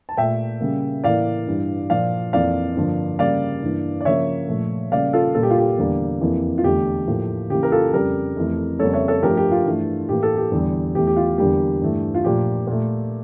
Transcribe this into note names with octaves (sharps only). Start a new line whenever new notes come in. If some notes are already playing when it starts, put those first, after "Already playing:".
A5
A#2 A3 E5 G5
C#3 G3 A#3
A2 E3 A#3 D5 F5
G2 E3 G3
A#2 F3 A#3 D5 F5
F2 E3 A#3 D5 F5
G2 D3 F3 A#3
C#3 G3 A#3 D5 F5
G2 E3 A#3
D5
C#3 F3 A#3 C#5 E5
A#2 F3 A3
C#3 G3 A#3 D5 F5
F4 A4
A#2 G3 A#3 A4
G4
F4
G4
E2 D3 G3 A#3
F2 E3 A#3
F4
E2 D3 A3 G4
A2 F3 A#3
C#3 E3 A#3 G4
A#4
F4 A4
F2 C#3 G3 G4 A#4
F2 E3 A3
F2 C#3 G3 A#3 A4 C#5
C#5 E5
A4 C#5
G2 F3 A3 G4 A#4
G4
F4
G2 E3 A3
A2 E3 A#3 G4
A4
G4
E2 D3 G3
E2 E3 A3 G4
G4
F4
E2 D3 G3 A#3 G4
G2 E3 A3
F4
A#2 F3 A3 G4
A#2 A3